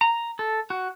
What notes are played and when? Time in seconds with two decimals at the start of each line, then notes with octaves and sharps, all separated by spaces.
0.01 A#5
0.39 A4
0.70 F#4